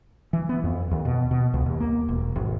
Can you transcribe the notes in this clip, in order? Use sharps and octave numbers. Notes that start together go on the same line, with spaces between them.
E3
B3
F2
D#2
B2
B2
C#2
D#2
A#3
E1
G#1